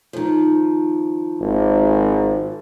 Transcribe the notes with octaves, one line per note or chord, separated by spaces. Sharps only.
D#3 F3
G#1